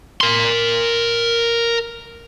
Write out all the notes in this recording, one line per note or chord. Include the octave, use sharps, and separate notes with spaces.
A#4 C6